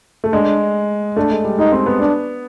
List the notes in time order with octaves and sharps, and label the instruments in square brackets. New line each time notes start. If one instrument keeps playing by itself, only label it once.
[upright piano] A3
[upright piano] G#3 [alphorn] D4
[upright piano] A3 [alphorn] D4
[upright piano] G#3
G3
[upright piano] G#3 [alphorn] D#4
[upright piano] C4
B3
[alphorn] D4